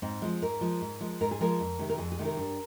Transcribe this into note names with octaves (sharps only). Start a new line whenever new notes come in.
G#2 C4
F3 G#3
G#2 A#4
F3 G#3
G#2
F3 G#3
G#2 A#4
G#4
F3 G#3 A#4
F2
C3 D#3 G#3
A#4
F2 G#4
G#4
C3 D#3 G#3
A#4
G2